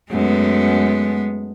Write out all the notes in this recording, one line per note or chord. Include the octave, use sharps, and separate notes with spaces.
F#2 G#3 A3 B3